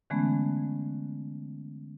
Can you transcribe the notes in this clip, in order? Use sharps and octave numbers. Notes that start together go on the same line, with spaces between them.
D3 E3 G#3 A3 B3 C#4